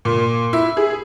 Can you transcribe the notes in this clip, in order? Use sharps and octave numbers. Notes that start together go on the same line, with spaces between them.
A#2
E4
G#4